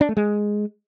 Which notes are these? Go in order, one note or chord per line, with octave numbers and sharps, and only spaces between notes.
D4
A3
G#3